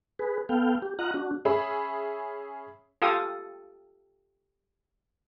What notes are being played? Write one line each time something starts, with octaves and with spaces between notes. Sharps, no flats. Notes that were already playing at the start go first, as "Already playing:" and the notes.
G#4 B4
B3 A4 F5 G5
G4
F4 D#5 F#5 A#5 F#6
D4 F#4
C#4 G#4 E5 B5
F4 G4 A4 F5 D#6